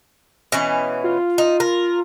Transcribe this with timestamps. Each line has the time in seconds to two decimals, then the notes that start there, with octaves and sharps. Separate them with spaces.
0.52 B2 E3 C#4
1.04 F4
1.38 D#4
1.60 A#4